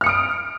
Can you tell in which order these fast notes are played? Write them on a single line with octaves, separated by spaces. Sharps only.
F6 C#7 D#6 D7